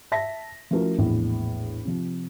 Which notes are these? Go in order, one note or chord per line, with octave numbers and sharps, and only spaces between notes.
E5 A5 A#6 B6
F3 A3 C#4 E4 F#4 A#4
A#1 E2 A2
C3 F3